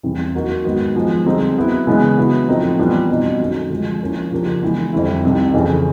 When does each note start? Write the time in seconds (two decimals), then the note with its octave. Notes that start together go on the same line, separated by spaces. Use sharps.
0.03 E2 C3 E3 G3
0.34 F#3 A#3 D#4 F#4 A#4
0.65 G#2 D#3 F#3 B3
0.96 F3 G#3 B3 D#4
1.26 D3 G3 C4 D#4 G#4
1.56 F#3 B3 E4
1.87 C#3 E3 G#3 B3 D4
2.18 F#3 B3 E4
2.48 A2 F3 A3 C4 D#4
2.79 E3 G3 B3 D4 F4
3.09 B2 G3 C4 D#4
3.40 F#2 D#3 F#3 A3 C#4
3.70 D3 F3 G#3
4.01 F3 A#3 C#4 E4
4.31 C#3 F3 A#3 D4 G4
4.62 E3 G#3 B3
4.93 F2 D3 G3 C4 E4
5.24 C2 C3 D#3
5.54 F2 C#3 E3 A3